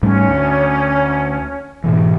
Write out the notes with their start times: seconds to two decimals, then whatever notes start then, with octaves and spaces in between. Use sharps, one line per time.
0.03 G#2 G3 A3 C#4
0.29 D2
1.84 G#2 B2 E3